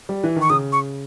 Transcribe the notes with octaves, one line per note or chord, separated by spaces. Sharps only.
G3
E3
D#3
C#6
C#3 D#6
C#6